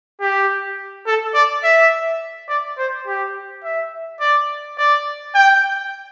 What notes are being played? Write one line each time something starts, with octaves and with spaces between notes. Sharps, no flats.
G4
A4
D5
E5
D5
C5
G4
E5
D5
D5
G5